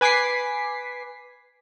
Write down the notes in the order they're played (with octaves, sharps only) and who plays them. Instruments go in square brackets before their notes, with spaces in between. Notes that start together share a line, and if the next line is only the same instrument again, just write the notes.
[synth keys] B4 G#5 D6 B6 C7